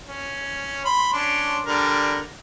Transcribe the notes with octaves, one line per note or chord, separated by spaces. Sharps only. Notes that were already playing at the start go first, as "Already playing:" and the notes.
C#4
B5 C6
C#4 D4 C6
D3 G3 A#4